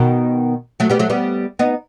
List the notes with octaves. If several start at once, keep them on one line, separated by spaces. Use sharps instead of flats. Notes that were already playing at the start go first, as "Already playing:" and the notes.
Already playing: B2 D#3
F#3 A3
G3 B3
F#3 A3
G3 B3
B3 D#4